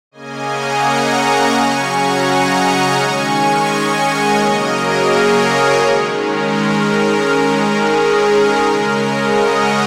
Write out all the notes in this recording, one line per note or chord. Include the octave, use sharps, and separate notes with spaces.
C#3 A#3 C#4 D#5 G#5
F#5 A#5
G#5 C#6
G#5 C#6
C#3 F#3 C#4
F#5 A#5
D#5 G#5
F#5 A#5
D#3 G#3 C#4 G#5 C#6
G#5 C#6
D#5 G#5
C#5 F#5
C#3 F#3 A#3 A#4 D#5
G#4 C#5
G#4
D#3 G#3 C#4
A#4
A#4
D#3 G#3 C#4
G#4
A#4
C#3 G#3 C#4
A#4 D#5
C#5 F#5